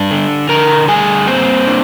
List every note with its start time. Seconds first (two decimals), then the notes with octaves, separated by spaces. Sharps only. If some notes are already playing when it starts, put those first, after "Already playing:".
Already playing: G3 D4 G4
0.11 D3
0.49 D3 A#4 A#5
0.88 G3 G#4 G#5
1.27 A#3 C4 C5
1.67 D4